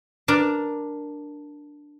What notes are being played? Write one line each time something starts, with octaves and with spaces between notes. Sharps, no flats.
D4 A#4 D5